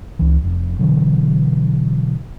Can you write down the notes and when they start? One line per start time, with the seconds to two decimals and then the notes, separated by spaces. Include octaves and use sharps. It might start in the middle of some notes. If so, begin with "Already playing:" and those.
0.19 C#2 E3
0.43 F1 F2
0.79 B2 D3 E3 F#3